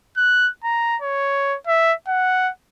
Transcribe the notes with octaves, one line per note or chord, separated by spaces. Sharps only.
F#6
A#5
C#5
E5
F#5